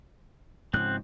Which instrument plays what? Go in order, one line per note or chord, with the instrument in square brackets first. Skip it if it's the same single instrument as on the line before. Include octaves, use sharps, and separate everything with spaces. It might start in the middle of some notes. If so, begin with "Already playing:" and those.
[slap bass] G#2 C#3 F3 [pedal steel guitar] C4 F#6